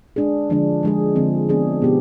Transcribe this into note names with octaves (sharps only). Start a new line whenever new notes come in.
G#3 D4 G#4
D3 F3 G#3 D4
F3 G#3 D4 G#4
D3 F3 C4
D3 F3 B3 D4 G#4
B2 G#3 B3 D#4 G4